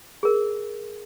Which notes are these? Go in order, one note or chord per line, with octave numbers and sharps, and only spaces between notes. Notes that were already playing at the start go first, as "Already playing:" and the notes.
G#4 A#4